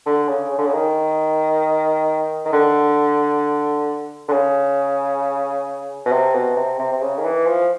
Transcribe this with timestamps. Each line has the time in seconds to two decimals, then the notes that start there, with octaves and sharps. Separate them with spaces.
0.06 D3
0.29 C#3
0.51 C#3
0.58 D3
0.66 C#3
0.73 D#3
2.45 D#3
2.53 D3
4.28 D3
4.32 C#3
6.06 B2
6.12 C3
6.34 B2
6.56 C3
6.79 C3
6.92 C3
7.02 C#3
7.18 D#3
7.24 E3
7.46 F3